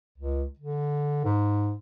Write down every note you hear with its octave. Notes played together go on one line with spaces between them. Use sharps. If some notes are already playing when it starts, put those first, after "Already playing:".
C#2
D3
G#2